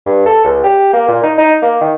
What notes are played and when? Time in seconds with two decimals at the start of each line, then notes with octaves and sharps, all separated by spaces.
0.06 G2
0.26 A4
0.44 C#2
0.63 G4
0.93 A#3
1.08 A#2
1.23 D#4
1.38 D#4
1.62 A#3
1.81 D#3